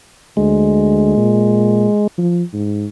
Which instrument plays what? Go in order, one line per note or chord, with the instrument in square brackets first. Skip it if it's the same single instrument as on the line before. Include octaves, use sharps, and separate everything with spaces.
[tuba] D2 [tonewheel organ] G#3
[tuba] A#2
F3
G#2